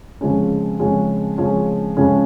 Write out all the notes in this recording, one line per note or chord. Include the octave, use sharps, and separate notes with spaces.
F2 C#3 F3 G#3 C#4
F2 C#3 F3 G#3 C#4
F2 C#3 F3 G#3 C#4
F2 C#3 F3 G#3 C#4